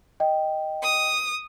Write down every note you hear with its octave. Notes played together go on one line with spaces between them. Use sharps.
D#5 G5
D#6